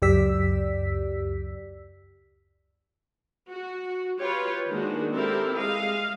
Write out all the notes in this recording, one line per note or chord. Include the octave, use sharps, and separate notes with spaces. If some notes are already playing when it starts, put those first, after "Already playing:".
C#2 F#2 G4 D5 E6 B6
F#4
F4 G4 B4 C#5
D#3 G#3 A#3 D4 F#4
C4 E4 G4 A4 A#4
G#3 D#5 F5